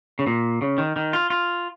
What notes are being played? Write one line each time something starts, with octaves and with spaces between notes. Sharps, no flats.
C#3
A#2
C#3
D#3
D#3
F4
F4